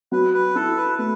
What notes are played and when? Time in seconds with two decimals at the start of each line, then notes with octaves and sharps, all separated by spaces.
0.12 F#3 B4
0.34 B4
0.55 E4 A4
0.77 B4
0.98 A3 B4